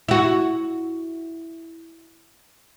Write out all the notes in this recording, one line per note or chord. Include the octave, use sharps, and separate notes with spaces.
E4 F#4